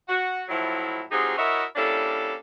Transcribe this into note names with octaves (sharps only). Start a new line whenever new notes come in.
F#4
F2 A2 F3 F#3 E4
F3 F#3 C4 D#4 G4 G#4
E4 F#4 A#4 C#5 D#5 E5
G3 A#3 C#4 D4 E4 A4